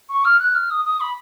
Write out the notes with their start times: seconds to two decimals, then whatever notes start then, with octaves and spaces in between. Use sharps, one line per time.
0.09 C#6
0.25 F6
0.39 F#6
0.54 F6
0.70 D#6
0.85 D#6
1.00 B5